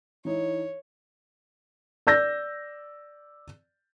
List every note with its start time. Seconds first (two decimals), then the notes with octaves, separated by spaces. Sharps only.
0.25 E3 D#4 E4 C#5
2.07 D5 E6 G6 A#6